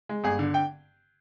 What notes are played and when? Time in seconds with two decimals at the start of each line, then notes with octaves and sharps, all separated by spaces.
0.09 G#3
0.24 G1 G#4
0.39 D3
0.54 G5